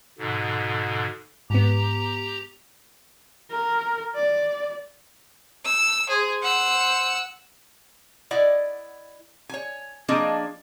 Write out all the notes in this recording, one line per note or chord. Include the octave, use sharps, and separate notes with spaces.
G#2 B2 D3
G#2 B3 G4 A#5
A#4
D5
E6
G#4 C5
F#5 E6
E4 D5 D#5 F#5
C#5 G#5
F3 A#3 C4 D4 G#4 D#5